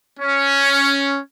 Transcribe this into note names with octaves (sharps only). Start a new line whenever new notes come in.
C#4